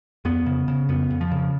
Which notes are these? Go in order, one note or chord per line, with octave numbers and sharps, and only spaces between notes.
F2 B3
C#3
C#3
F2 B3
F2
F3
C#3